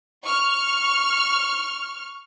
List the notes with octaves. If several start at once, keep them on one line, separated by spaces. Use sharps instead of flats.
C#6 F6